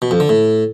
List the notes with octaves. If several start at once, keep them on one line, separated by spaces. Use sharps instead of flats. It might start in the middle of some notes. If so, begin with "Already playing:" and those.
B2
F2
D3
A2